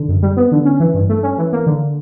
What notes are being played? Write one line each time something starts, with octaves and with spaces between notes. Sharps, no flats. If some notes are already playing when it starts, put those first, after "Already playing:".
Already playing: D3
F#2
G3
B3
D3
C#4
E3
G2
A3
C#4
E3
A#3
D3